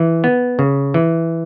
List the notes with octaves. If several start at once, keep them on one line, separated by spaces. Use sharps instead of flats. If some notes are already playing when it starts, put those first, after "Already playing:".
Already playing: E3
B3
C#3
E3